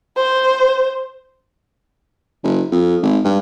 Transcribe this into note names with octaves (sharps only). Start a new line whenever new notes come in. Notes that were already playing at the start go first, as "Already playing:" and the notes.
C5
F#1
F2
G#1
G2